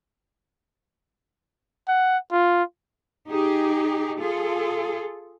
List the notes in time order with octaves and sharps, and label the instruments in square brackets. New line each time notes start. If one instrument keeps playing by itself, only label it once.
[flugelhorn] F#5
F4
[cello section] D#4 G4 G#4
F4 G#4 A4